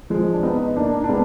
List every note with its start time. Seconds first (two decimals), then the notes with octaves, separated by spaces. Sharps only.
0.10 F3 G#3
0.34 D4
0.43 B3 D#4
0.68 D#4
0.76 A#3 D4
1.04 D4
1.09 G#3 B3